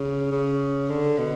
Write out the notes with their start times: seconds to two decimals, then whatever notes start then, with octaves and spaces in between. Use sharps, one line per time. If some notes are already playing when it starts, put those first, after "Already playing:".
Already playing: C#3
0.32 C#3
0.90 D3
1.18 B2